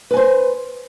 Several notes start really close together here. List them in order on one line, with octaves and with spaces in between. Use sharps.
B4 G#5 C5